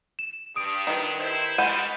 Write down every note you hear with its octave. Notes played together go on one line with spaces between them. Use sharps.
E7
G2 D#6 D7
D#3 B4
E4 C5
C#3 E3 G3 G#3 F#5 B5 G6 D#7